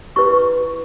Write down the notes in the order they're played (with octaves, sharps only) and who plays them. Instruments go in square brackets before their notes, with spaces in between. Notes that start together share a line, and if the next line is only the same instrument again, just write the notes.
[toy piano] E4 G4 B4 C#6